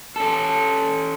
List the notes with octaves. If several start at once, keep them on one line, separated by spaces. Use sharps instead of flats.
C#4 A4